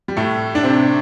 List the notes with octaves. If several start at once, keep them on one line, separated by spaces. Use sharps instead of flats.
G3
A2 A3
D4
C3 C4